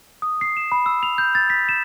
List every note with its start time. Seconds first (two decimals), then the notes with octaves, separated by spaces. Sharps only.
0.22 D#6
0.41 C7
0.57 E7
0.72 B5
0.86 E6
1.03 F7
1.18 G6
1.35 A6
1.50 B6
1.69 E7